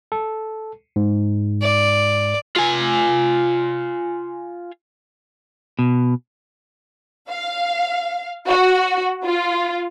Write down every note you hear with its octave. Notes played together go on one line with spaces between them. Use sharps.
A4
G#2
D5
F4 G#5
B2
F5
F#4
F4